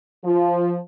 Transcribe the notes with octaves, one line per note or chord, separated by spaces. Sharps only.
F3